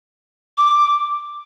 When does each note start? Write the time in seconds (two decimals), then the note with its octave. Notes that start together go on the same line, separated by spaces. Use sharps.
0.58 D6